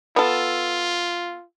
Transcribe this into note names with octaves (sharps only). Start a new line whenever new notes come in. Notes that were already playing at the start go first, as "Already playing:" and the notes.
B3 F4 A4